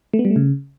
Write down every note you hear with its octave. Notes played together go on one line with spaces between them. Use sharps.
A3
B3
G3
A3
C#3